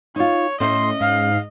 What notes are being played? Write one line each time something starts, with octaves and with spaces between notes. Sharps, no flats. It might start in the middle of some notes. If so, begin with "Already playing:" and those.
D#4 F4 C#5
A2 C#4 D#5 E5 C6
G#2 F5